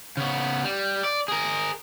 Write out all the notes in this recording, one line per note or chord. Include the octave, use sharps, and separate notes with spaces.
C#3 B3
G3
D5
G#4 A#4